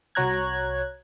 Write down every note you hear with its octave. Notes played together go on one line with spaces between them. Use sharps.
C2 F#4 C#5 A#5 F#6 G#6